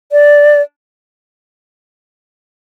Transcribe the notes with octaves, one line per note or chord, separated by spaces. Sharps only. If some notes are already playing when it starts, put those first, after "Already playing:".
D5